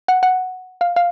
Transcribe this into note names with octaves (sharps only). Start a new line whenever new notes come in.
F#5
F#5
F5
F5